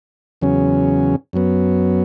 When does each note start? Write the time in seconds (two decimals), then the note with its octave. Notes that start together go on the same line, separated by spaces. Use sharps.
0.41 E2 C#3 F#3 C#4
1.33 F#2 F#3 B3